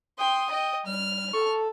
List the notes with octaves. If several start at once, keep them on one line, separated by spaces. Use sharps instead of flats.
G5 C6 D#6
D#5 G5
G3 F6
A4 C#6